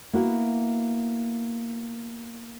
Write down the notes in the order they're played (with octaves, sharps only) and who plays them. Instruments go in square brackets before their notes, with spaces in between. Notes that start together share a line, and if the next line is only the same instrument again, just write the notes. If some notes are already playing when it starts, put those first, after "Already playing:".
[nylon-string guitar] A#3 B3 E4 F#4